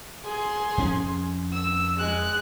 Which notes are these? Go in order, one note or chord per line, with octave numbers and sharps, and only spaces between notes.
G#4 C6
F2 C#4
E6
G#3 F#6